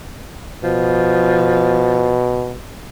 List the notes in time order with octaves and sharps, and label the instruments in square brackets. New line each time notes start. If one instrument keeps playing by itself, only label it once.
[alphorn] B2 [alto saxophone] F3